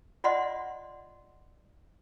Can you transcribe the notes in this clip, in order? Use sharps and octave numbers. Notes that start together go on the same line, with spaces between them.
F4 D5 D#5 F#5 C6